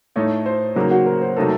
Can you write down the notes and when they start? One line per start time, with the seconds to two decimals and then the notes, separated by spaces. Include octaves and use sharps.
0.16 A2 A3 D#4 A4 C#5
0.46 C5
0.75 C#3 F#3 A#3 D#4 A#4
0.91 F#4
1.06 A#4
1.21 C5
1.36 C3 F#3 A3 D#4 A4 A#4